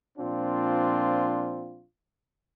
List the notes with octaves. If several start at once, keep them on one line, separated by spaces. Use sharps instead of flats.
A#2 F3 C4 D4 F4